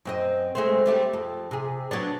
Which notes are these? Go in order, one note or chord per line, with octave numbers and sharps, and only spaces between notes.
F#2 C4 D#5
G#3 A3 C4
G3 A3 G4
F2
C3 G#4
F#3 B3 D4